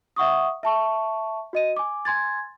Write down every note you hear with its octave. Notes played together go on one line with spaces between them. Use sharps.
E5 F#5 C#6 D#6
E5 A5 C#6
F#4 D#5 D#7
G#5 D6
G#5 C6 G#6 A6